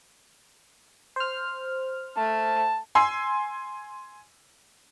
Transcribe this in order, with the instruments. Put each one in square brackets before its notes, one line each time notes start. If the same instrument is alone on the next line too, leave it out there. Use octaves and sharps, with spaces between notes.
[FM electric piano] C5 F6
[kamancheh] A3 [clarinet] A5
[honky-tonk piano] G#5 C6 E6 C7